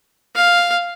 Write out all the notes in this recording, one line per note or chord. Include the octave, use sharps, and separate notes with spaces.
F5